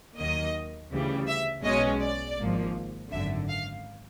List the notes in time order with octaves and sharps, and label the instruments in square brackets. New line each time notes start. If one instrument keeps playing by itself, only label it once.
[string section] D#2 D#3 F#3 A#3 D#5
D2 C#3 E3 G3
E5
B1 B2 G#3 C#4 D#5
D5
G#1 G#2 F3 A#3
G#1 F#2 D3 E5
F5